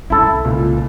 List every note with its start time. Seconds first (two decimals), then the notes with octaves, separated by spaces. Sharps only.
0.10 C2 C#4 E4 A4
0.45 C#2 A#2